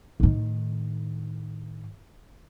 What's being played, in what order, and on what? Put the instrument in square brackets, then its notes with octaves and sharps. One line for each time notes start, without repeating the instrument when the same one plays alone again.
[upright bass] A2 D#3